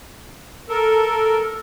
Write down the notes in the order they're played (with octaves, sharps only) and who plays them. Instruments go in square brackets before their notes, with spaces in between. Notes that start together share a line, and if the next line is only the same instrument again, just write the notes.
[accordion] A4 A#4